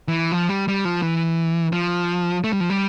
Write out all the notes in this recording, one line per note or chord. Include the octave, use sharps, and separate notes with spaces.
E3
F3
G3
G3
F3
E3
F3
A3
G3
F3
G3